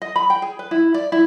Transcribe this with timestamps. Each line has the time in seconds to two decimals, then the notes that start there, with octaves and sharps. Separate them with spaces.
0.02 D#5
0.16 B5
0.30 G5
0.42 G#4
0.59 B4
0.71 E4
0.94 D5
1.12 E4